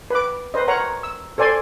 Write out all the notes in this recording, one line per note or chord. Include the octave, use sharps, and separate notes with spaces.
B4 D6
B4 C5 D#5
A#4 C#5 F#5 A#5
E6
A4 C5 D5 G#5 C6